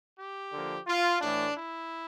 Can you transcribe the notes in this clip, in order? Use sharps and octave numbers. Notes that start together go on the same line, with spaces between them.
G4
D3 F3 A#3
F4
A2 E3 A3 D4
E4